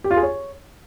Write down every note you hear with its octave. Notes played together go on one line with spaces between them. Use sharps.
G4
F4
G#4
C#5